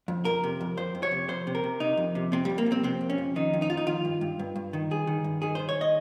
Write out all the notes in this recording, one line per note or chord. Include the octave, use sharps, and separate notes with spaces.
F2
F2 A#4
C3
F2
F2 C5
F2
C#5
C3
F2 C5
C3
A#4
C3
C3 D#4
F2
C3
C3 C4
F2 G3
A#3
F2
C4
C3 C4
F2
C#4
F2
D#3 D#4
F2
D#4
F2 F4
D#4
D#3 F4
G2
G2
G2
G2
D#3
G2 G#4
D#3
G2
D#3 G#4
D#3 C5
C#5
D#5